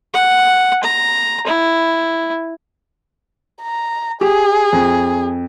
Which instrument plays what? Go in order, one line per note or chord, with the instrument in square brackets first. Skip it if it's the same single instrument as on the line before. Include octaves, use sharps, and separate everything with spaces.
[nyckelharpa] F#5
A#5
E4
[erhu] A#5
[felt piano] G4 [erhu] G#4
[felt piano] F2